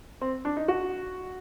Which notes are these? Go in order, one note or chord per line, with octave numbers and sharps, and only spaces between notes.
C4
D4
D#4
F#4